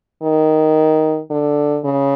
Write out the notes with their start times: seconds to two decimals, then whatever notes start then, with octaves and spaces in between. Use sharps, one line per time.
0.23 D#3
1.31 D3
1.84 C#3